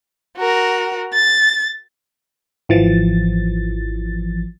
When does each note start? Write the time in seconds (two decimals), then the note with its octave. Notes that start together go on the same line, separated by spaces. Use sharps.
0.37 F#4 A#4
1.14 A6
2.69 G#1 E3 F3 A6